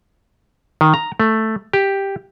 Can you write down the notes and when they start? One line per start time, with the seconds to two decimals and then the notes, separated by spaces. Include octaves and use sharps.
0.81 D#3
0.94 A#5
1.20 A3
1.73 G4